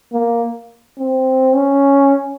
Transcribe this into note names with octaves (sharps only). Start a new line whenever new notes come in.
A#3
C4
C#4